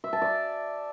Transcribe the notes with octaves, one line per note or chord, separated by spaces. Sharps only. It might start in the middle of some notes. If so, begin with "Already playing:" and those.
E5
A5
D5